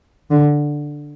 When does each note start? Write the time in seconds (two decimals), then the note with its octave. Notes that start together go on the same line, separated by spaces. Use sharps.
0.31 D3